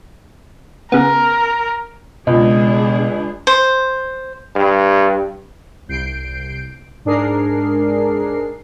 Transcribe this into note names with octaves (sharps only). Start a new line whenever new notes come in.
C#3 B3 A#4
C#2 B2 G#3 D4 G#4 D#5
C5
G2
C2 G6 C7 D7
G#2 D4 G#4 A#4 C7